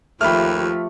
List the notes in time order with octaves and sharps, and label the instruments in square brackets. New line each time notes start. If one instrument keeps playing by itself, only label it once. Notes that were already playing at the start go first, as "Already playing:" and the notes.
[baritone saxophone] D#2 [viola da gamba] F3 [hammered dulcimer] A3 G4 [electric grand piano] B5 F6